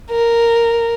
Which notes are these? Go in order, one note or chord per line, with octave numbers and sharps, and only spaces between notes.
A#4